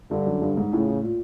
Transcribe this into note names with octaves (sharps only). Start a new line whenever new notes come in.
G2 D3
F#2
G2
G#2
A2 C#3
A2
A#2